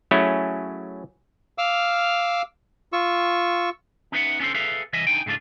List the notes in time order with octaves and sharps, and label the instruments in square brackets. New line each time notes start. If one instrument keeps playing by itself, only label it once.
[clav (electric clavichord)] F#3 A3 C#4 E4 G#4
[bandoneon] F5 D6 E6 F6
F4 C#6 E6
[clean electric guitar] C#4 D#4 B4 C5 E5 F#5
B3 C#4 D4 G#4 A4 C5
G#4 A4 B4 E5 F5
C2 E3 D#5 E5 G#5
D4 D#4 G5 G#5
G#2 C#3 A3 D4 F4